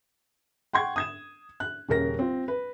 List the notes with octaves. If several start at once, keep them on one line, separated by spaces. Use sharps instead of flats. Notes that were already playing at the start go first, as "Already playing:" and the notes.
F#5 G5 C6 C#6 G#6
D#6 G#6 E7
F#6
D#1 C#3 A#4 A#6
C4 F4
B4